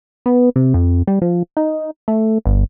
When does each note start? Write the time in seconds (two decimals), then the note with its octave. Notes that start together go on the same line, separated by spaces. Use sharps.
0.26 B3
0.56 C3
0.74 F2
1.07 G3
1.21 F3
1.57 D#4
2.08 A3
2.45 G1